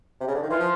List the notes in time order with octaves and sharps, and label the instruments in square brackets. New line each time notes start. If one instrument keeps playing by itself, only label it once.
[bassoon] C3
C#3
D3
D#3
[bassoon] E3 [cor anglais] F4
[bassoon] F3